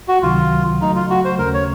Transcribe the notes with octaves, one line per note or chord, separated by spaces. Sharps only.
F#4
C#2 C3 D#3 F#3 F4
C#3 F#3 A3 D#4
F4
F#4
C5
D#2 C#3 A3 C#4 A#4
C#5